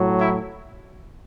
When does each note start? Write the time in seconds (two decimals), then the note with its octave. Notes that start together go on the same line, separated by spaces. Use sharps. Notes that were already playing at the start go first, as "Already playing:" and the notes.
Already playing: A2 F#3
0.19 E4